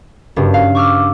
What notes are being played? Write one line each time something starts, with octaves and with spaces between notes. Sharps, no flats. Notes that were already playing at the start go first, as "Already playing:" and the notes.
F#1 G2
F5
C#6 D6 E6 F6